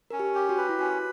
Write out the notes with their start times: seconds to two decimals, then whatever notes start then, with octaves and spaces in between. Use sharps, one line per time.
0.11 C#4 A#4
0.20 G4
0.35 G4
0.49 F#4
0.58 B4
0.69 E4
0.79 C#4 F#4